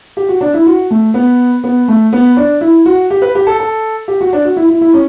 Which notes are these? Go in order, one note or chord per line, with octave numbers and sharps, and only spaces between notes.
G4
F#4
D4
E4
F#4
A3
B3
B3
A3
B3
D4
E4
F#4
G4
B4
G4
A4
A4
G4
F#4
D4
F#4
E4
E4
E4
C#4